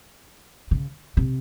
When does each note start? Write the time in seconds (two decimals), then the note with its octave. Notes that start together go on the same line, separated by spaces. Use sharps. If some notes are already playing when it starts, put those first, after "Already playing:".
0.71 C#3
1.17 C3